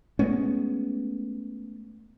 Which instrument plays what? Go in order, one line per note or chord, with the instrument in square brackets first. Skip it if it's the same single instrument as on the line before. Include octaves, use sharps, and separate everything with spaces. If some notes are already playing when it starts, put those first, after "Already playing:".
[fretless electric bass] G#3 A3 B3 C#4